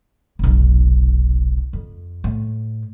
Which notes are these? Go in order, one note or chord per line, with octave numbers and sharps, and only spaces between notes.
F1 B1
F2
A2